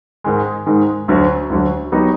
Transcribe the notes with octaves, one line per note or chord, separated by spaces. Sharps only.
G#2 D#3 G#3
G#2 D#3 G#3
D2 D3 F#3
D2 D3 F#3
F#3 B3 D#4 G4